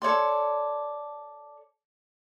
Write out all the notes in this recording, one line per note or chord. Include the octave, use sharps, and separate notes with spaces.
A4 C#5 D5 C6